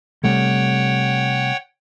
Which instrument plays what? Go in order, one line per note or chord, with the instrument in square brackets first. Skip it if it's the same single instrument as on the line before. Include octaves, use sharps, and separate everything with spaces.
[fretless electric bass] C3 G3 A3 [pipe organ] C#5 F#5 G5